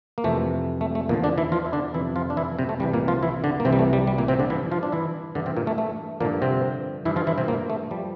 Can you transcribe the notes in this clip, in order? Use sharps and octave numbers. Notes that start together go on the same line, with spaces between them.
A#3
F2 C3 E3 A3
A3
A3
E2 A#2 D3 F3 A#3
D3 D4
E3 E4
F3 F4
E4
D3 D4
F2 C3 E3 F3 E4
F3 F4
D4
E3 E4
C3 C4
A3
C2 C3 E3 G3
A#2 A#3
F3 F4
E3 E4
D3 D4
A#3
C2 C3 E3 C4
G3
A3
G3
G3
A#2 A#3
C3 C4
D3 D4
G2 E3 F3 E4
F3 F4
D4
E3 E4
G2 D3 E3 D4
C3 C4
A#2 A#3
A3
A3
G2 A#2 D3 F3 A#3
C3 C4
G2 E3 E4
F3 F4
E3 E4
C3 C4
A#2 A#3
A3
F3 G3